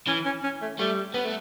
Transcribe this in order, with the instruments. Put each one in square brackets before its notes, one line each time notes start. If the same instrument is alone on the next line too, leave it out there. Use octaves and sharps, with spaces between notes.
[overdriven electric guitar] E3 [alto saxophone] C#4
[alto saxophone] C#4
C#4
A3
[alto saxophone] G3 [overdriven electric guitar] A3
[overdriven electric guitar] B3
A3